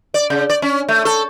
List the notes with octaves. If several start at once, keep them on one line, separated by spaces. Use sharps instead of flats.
D5
C#3
D5
C#4
A3
A4